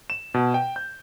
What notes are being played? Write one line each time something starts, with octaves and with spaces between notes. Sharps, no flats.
E7
B2
G5
G6